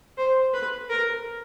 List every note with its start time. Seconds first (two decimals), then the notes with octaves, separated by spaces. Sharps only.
0.18 C5
0.54 B4
0.90 A#4